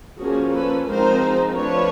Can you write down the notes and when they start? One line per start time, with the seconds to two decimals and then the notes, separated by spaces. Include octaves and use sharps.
0.19 F3 A#3 C#4 F#4 G#4
0.53 A4 B4
0.88 F3 G#3 C4 D#4 A#4 C5
1.56 F3 A3 D4 B4 C#5